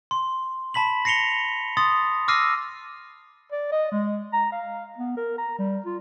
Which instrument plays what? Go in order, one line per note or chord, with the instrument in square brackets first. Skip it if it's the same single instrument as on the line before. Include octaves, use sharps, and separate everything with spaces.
[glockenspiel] C6
A5 B5 B6 F#7
A#6 C7 C#7 F7 G7
C6 D#6 A6
D6 E6 F6 A#6 C7 D#7
[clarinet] D5
D#5
G#3
A#5
F5
B3
A#4
A#5
G3
F4